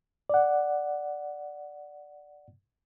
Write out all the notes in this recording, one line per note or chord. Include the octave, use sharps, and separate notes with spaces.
D5 F#5